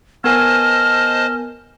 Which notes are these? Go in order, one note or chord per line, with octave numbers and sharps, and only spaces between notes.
B3 A#4 C5 D#5 G#5 A5 F6